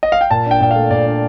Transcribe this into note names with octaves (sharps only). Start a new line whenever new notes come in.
D#5
F5
G5
A#2 A5
D4 G5
A#2 G5
A3 F5
A#2 D5
D4